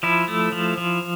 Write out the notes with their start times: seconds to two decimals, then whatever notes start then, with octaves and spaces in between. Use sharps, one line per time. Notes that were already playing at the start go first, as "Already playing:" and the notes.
0.03 F3 E4
0.28 A3
0.52 F3
0.78 F3